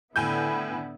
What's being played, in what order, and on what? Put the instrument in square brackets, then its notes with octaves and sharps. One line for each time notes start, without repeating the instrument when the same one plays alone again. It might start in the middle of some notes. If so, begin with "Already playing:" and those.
[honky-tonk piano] A2 G#5 G6 [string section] D3 B3 E4